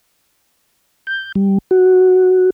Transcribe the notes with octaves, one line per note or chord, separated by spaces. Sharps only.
G6
G3
F#4